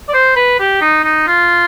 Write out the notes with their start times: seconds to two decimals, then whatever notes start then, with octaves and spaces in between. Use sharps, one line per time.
0.09 D5
0.14 C5
0.36 B4
0.60 G4
0.81 D#4
1.04 D#4
1.27 F4